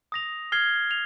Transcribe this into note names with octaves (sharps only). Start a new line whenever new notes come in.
D#6 A#6 F7
F6 G#6 C7 G7
F7